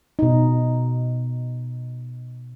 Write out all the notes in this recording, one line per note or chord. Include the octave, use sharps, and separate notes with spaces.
B2 D#4